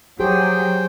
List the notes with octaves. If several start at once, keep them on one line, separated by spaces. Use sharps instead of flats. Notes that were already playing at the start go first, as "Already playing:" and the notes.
F#3 G4 G#4 C5 G5